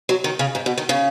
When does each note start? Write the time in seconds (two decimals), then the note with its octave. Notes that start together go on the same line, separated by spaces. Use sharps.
0.09 F#3
0.24 D#3
0.39 C#3
0.55 G#2
0.66 B2
0.78 D#3
0.89 C#3